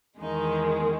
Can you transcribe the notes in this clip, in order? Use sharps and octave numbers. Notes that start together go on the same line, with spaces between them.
E2 D#3 G#3 D#4